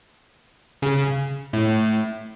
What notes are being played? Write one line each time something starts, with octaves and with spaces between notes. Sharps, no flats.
C#3
A2